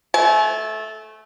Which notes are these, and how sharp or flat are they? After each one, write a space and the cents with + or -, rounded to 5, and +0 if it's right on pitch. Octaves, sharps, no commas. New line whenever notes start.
A3 -15 G#5 +40